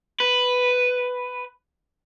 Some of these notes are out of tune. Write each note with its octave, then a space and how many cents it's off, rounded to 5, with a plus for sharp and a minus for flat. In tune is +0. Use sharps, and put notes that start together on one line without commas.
B4 +5